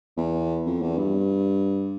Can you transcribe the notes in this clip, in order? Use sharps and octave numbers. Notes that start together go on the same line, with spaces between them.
E2
F2
E2
G2